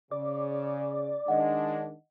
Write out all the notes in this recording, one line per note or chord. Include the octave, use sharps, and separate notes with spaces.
C#3 D5
D#3 G#3 D4 D#5 F#5